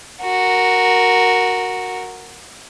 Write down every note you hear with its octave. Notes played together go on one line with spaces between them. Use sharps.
F#4 A#4